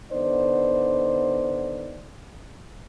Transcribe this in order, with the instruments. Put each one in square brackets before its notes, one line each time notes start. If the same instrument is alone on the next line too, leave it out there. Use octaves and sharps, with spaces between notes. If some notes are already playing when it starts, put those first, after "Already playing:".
[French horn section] D3 B3 D#4 C5 D5